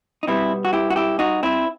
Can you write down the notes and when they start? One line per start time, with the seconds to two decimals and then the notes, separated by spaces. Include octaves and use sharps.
0.23 D#4
0.27 B2 G3 B3 C4 E4
0.65 F#4
0.73 E4 G4
0.90 F#4
0.96 E4 G4
1.19 D#4 F#4
1.43 C4 E4